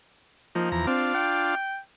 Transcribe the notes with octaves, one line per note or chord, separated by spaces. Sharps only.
F3 A#3 D#4
E2 A#5
C4 D4 F4
G5